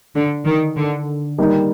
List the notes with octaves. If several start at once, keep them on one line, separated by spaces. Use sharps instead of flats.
D3
D#3
D3
D#3 G3 A#3 D#4